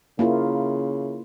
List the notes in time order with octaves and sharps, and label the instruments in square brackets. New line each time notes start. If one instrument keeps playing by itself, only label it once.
[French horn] C#3 [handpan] A#3 E4 F4